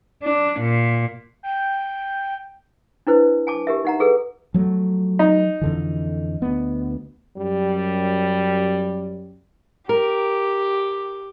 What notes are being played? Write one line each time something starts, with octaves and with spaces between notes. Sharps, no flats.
D4
A#2
G5
D4 E4 B4 C5
G#5 A5 D6
G4 A#4 E5
D#4 F#5 A#5
G#4 A4 B4
F3 F#3 A3
D#4
F2 D3 E3
D2 B3
F#2 G3
G4 A#4